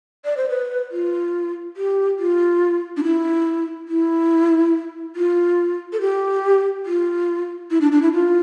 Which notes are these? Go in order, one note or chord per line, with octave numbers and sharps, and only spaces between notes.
D5
C5
B4
F4
G4
F4
D4
E4
E4
F4
A4
G4
F4
E4
D4
D4
E4
F4